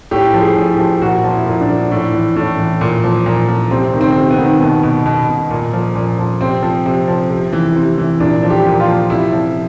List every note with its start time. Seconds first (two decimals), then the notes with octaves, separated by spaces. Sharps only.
0.11 A2 G4
0.34 F3
0.41 G#4
0.56 A2
0.72 G4
0.79 F3
1.01 A#2 F#4
1.24 F3
1.31 E4
1.46 A#2
1.61 D4
1.69 F3
1.91 A2
2.14 E3
2.36 A2
2.58 E3
2.81 A#2
3.04 F3
3.26 A#2
3.48 F3
3.71 C3 C4
3.93 D#3
4.01 C4
4.16 C3
4.31 B3
4.39 D#3
4.61 B2 B3
4.83 B2
5.06 B2
5.28 B2
5.51 A#2
5.73 F3
5.95 A#2
6.18 F3
6.41 C3 C4
6.63 F3
6.86 C3
7.08 F3
7.30 C3
7.53 E3
7.75 C3
7.98 E3
8.20 A#2 D4
8.43 F3
8.50 G4
8.65 A#2
8.80 F4
8.88 F3
9.10 C3 E4
9.33 F3